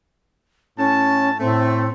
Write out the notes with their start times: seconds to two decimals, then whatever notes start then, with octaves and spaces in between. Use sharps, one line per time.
0.78 A2 C#4 A5
1.40 A2 A3 C4